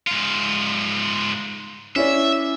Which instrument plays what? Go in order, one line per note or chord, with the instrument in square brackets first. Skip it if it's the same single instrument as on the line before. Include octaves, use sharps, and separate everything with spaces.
[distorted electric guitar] G#2 F4
[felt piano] C#4 E4 D5 [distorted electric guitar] E5